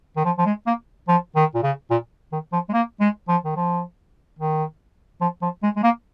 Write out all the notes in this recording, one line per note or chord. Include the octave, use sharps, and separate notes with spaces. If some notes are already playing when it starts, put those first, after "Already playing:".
D#3
F3
F3
G#3
A#3
F3
D#3
A#2
C#3
A#2
D#3
F3
G#3
A#3
G#3
F3
D#3
F3
D#3
F3
F3
G#3
G#3
A#3